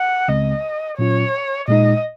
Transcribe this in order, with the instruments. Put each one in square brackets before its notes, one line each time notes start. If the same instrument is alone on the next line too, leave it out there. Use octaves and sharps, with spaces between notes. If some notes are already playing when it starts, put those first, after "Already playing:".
Already playing: [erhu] F#5
[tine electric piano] C#2 C#3 G#3 C4 [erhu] D#5
[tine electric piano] A#2 F#3 C#4 F4 [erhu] C#5
[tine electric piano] A#2 G#3 D#4 [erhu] D#5